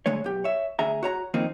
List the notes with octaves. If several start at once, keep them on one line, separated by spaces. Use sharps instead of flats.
D3 G#3 A3 C#5
B1 G4
C#5 E5
D2 G#4 E5 A#5
F#4 C#5 A#5
D#3 F3 A#3 C4 D#4